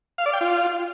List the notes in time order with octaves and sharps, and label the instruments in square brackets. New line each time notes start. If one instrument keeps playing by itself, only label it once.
[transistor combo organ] F5
D5
G5
F4